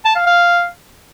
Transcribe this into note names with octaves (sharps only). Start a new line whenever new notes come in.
A5
F5
F5